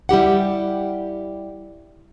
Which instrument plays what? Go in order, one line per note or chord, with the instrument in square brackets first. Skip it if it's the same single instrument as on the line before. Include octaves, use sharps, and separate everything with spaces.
[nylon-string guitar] G3 E4 G4 F#5